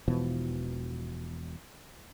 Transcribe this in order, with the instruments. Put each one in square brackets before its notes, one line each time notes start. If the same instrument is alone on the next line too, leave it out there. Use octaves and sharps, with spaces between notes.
[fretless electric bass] E1 B2 E3 F3